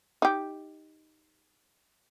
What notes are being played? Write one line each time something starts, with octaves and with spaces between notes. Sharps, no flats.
D#4 G4